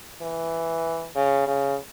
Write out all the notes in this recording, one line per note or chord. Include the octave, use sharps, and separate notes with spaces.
E3
C#3
C#3